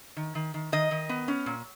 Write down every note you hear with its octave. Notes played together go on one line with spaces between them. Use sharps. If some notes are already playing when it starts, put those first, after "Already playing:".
D#3
D#3
D#3
D#3 D#5
D#3
B3
C#4
A#2